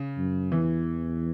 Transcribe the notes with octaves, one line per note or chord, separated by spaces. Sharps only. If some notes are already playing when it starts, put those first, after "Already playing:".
Already playing: C#3
F#2
E2 E3